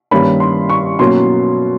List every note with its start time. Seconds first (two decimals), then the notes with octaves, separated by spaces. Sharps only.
0.11 G2 D#3 G3 A#3 C#4 B5
0.40 C6
0.69 C#6
0.99 B2 F#3 A#3 C#4 C6